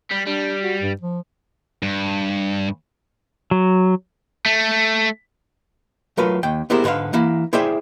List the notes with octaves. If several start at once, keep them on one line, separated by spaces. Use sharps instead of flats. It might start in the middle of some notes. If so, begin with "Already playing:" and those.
G3
G3 D4
F#4
G2
F3
G2
F#3
A3
F#3 A3 F4 A#4 B4
D#2 G5
B3 E4 G4 G#4 A#4 C5
G#2 D3 B4 C#5 F5
E3 A#3 E4
E4 G#4 C5 D5 E5 G5